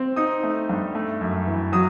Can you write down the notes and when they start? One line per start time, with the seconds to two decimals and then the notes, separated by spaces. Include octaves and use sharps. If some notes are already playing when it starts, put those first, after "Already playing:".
Already playing: C4
0.16 D#4 D#6
0.43 A3
0.69 G2
0.95 A3
1.21 F#2
1.47 E3
1.73 F#3 D#6